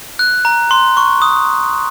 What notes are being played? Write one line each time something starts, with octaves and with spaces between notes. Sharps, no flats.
F#6
A#5
C6
C#6
D#6